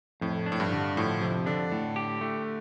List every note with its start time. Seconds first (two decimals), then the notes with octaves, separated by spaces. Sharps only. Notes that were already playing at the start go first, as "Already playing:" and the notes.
0.21 F2 A2
0.46 D4
0.52 A2
0.60 G2
0.72 D3
0.96 A2 F3
1.22 F2 C3
1.46 D3 D4
1.72 A2
1.96 G4
2.21 A3